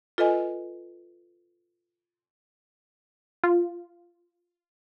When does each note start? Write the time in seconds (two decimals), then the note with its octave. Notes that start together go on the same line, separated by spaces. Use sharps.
0.18 F4 A4 B4 D#5 G#5
3.44 F4